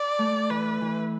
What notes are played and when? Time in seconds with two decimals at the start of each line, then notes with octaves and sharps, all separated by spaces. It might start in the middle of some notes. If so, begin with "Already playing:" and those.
Already playing: D5
0.19 A3
0.50 E3 B4
0.81 E3